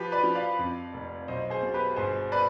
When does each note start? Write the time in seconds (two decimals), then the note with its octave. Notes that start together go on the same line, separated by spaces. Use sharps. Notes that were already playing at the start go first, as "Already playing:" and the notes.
Already playing: F3 G4 B4
0.12 B4 D5
0.24 F3
0.35 D5 F5
0.59 F2
0.93 F1
1.28 B1 C5 D#5
1.50 G#4 C5
1.62 B2
1.74 G4 B4
1.96 G1 G#4 C5
2.32 B4 D5